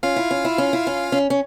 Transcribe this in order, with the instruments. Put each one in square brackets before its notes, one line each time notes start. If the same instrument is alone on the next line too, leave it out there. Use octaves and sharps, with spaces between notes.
[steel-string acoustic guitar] C#4 [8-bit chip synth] F4 F5
[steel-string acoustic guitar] E4
C#4
E4
C#4
E4
C#4
C#4
C#4